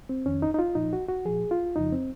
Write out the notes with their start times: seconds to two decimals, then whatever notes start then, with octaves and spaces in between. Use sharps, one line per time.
0.09 C4
0.26 F2 D#3 C#4
0.42 D#4
0.54 D#4
0.59 F4
0.75 A#2 F3 D#4
0.93 F#4
1.08 F#4
1.25 A#2 F3 G#4
1.51 F4
1.76 F2 C#3 F3 D#4
1.92 C4